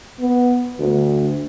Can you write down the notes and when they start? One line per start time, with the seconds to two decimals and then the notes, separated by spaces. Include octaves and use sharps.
0.20 B3
0.79 D2